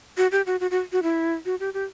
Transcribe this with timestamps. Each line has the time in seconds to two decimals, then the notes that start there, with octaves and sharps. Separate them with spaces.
0.17 F#4
0.32 G4
0.46 F#4
0.60 F#4
0.71 F#4
0.92 F#4
1.03 E4
1.45 F#4
1.60 G4
1.74 G4